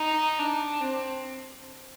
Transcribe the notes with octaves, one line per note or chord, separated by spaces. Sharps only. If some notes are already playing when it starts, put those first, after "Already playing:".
Already playing: D#4
D4
C4